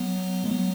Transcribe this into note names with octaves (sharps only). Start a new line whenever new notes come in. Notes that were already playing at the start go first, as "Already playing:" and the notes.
Already playing: F#3 B3
G#3
F#3 B3